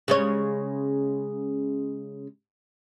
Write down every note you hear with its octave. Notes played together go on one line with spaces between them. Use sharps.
C#3 G#3 C#5